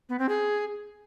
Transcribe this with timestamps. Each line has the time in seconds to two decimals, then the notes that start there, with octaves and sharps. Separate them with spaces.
0.09 B3
0.19 C4
0.29 G#4